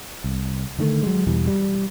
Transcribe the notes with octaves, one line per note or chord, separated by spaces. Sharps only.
C2
D3 D#3 A3
F#3 G#3
E2 B2 E3 G3
G3